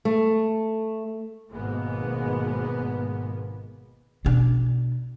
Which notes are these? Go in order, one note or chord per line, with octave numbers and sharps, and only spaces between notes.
A3
G#1 G#2 B2 G#3 A#3 B3
B2 D4